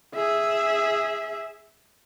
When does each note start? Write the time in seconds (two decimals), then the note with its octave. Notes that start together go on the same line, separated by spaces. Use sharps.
0.15 G#4 E5